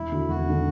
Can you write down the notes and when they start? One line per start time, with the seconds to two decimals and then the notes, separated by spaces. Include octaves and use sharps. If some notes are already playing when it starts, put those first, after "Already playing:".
Already playing: E1 E4
0.12 D2 D3
0.28 E1 F#4
0.45 D2 D3